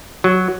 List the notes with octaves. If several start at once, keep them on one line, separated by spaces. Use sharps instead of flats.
F#3